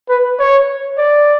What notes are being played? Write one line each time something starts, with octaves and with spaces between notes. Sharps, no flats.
B4
C#5
D5